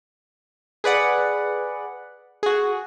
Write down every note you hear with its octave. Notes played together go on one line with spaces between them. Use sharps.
G#4 B4 D5 F#5
F#4 G#4